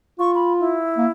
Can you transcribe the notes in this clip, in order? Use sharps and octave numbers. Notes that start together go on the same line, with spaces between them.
F4 C#6
B5
E4
A#3